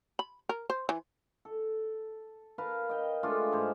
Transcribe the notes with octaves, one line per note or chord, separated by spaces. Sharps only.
B5
A#4
C5
E3
A4
A#4 B4 F5 A5
D#5 G5
G#3 A3 D4 F4
G#2 G#4 C5 F5